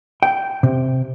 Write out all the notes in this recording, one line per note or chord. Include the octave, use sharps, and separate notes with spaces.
G5
C3